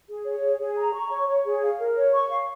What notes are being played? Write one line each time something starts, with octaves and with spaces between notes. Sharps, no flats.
G#4
C#5
G#4
G#4
A#5
C#6
C#5
C#5
G#4
F5
A#4
C#5
C#6
F5